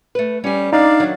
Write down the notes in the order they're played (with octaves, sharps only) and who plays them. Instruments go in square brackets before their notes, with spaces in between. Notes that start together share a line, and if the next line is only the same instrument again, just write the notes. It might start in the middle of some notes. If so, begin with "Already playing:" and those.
[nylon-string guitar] A3 B4
[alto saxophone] G3 [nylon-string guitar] C#4 G#5
[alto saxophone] D4 [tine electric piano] D#4 [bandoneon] D5 F5
[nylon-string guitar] D#3 F#3